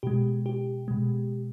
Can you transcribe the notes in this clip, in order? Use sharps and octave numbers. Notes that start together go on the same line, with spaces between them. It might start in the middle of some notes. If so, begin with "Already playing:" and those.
B2 G#3 G4
G4
B2 G#3